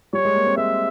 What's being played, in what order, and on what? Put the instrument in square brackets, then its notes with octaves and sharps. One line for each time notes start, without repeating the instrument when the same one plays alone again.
[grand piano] G3 [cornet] C#5
[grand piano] G#3
A#3
C4
[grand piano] G#3 [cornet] E5